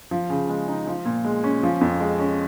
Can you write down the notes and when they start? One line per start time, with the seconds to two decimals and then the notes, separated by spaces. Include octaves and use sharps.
0.11 F3
0.30 C#3
0.49 G#3
0.68 D#4
0.87 F3
1.05 A#2
1.24 G#3
1.44 C#4
1.63 F3
1.81 F2
2.00 G#3
2.19 C#4